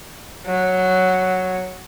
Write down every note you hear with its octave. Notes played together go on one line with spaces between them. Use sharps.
F#3